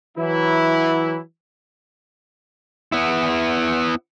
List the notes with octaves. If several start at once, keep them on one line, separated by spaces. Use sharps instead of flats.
E3 F#3 E4
B3 E4